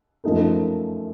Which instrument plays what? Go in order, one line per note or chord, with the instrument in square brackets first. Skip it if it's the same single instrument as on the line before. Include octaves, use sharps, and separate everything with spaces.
[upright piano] F#2 F3 A3 D#4 A#4